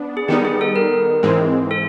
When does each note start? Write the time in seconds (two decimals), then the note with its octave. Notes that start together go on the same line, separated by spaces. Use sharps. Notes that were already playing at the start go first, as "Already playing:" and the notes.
Already playing: B3 D4
0.17 G#4
0.28 D#3 G3 B3 D#4 G4
0.45 G#4
0.61 A4
0.76 A#4
1.23 G#2 E3 G#3 C4
1.71 A4